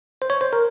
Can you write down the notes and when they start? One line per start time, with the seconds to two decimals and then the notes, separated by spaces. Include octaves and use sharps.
0.22 C5
0.30 C#5
0.41 C5
0.53 A#4